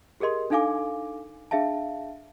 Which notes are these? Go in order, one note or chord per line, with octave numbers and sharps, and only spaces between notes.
G4 G#4 A#4 D#5 C6
D4 D#4 A4 F5 G#5 D6
D4 G#4 E5 F5 A5